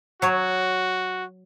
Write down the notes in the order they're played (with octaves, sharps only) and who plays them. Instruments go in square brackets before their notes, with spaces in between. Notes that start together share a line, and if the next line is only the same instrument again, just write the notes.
[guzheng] F#3 C#5 [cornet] F#4